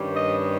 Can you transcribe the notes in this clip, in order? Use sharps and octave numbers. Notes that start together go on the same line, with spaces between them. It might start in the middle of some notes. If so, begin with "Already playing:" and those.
Already playing: G2 D#3 G3 C#4
D#5